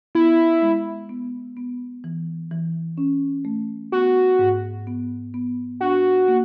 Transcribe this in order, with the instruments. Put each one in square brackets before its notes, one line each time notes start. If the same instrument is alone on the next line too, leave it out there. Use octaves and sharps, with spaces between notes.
[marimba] B3 [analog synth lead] E4
[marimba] G#3
B3
B3
E3
E3
C#4
A3
[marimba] B3 [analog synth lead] F#4
[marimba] G#2
B3
B3
[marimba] D4 [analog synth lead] F#4
[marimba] A#3